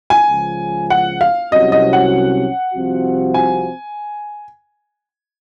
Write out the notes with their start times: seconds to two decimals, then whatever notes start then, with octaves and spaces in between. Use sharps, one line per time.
0.10 G#5
0.30 C#2 C#3 F3
0.90 F#5
1.21 F5
1.52 C2 C3 F#3 C#4 F#4 D#5
1.72 D#5
1.93 F#5
2.74 C2 C3 F3 C4 F#4
3.34 G#5